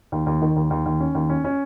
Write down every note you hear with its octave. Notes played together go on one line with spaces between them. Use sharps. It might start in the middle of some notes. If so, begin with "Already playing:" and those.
D#2
D#2
D#3
D#2
D#2
D#2
C#4
D#2
C#4
C#4